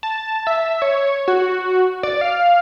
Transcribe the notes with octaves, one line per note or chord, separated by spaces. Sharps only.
A5
E5
C#5
F#4
D5
F5